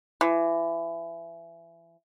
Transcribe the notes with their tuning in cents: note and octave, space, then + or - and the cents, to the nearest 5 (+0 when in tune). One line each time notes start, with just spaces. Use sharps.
E3 +25